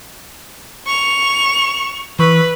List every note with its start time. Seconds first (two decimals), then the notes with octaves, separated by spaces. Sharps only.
0.86 C#6 F7
2.19 E3 B4 C#6 E6